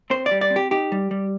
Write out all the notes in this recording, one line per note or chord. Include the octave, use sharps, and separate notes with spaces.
C4 C5
D5
G3
D5
C4
G4
D#4 G4
G3
G3